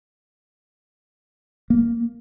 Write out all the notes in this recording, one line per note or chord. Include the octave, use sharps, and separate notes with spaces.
A#3